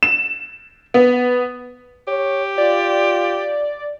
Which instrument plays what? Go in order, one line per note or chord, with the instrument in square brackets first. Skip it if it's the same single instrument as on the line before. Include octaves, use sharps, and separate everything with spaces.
[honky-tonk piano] E7
B3
[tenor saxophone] G4 [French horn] C#5
[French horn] F4 [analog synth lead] D5